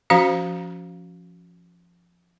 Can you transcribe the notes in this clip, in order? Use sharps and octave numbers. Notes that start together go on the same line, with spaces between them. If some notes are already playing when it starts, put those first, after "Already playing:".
F3 C#4 F#4 C5 F5 A#5